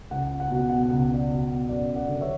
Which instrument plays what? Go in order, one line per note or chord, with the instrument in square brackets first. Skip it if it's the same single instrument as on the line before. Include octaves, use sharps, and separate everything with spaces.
[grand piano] C#2 F#5
F#5
F#5
B2 F#5
F#5
F#5
C#2
F#5
D5 F#5
B2
F#2 D5 F#5
D5 F#5
D3
C#5 E5